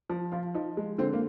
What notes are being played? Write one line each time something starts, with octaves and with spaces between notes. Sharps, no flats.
F3
F3 F4
F3 D#4
G#3
D3 C4
A#3